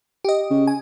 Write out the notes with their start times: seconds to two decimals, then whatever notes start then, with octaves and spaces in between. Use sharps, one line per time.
0.25 G4 D#5
0.51 C#3
0.67 G#5